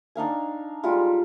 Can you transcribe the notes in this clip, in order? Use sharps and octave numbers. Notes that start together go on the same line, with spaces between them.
D4 D#4 F5 G#5
G3 G#3 F4